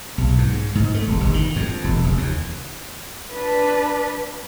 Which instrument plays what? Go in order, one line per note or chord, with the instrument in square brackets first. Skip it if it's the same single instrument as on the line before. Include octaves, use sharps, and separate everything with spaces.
[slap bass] B1
G#2
G#2
A3
E1
G1
D#3
F2
E1
F1
D#2
[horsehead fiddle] D4 B4